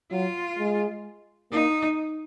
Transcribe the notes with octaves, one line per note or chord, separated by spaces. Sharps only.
F#3 F4
G#3
A#3 D#4